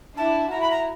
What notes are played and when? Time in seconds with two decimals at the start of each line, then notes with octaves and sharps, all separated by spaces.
0.17 D4 E4 A5
0.50 E4 F#4 A#5
0.61 B5
0.71 A#5